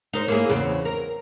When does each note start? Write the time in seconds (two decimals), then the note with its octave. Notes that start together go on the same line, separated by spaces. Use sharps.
0.13 D#4 A#4 C5
0.28 A#3 E4 G#4
0.49 E2 C#3 C4
0.85 A#4